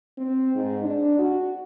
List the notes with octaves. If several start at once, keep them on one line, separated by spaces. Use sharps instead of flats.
C4
G#2
D4
F#4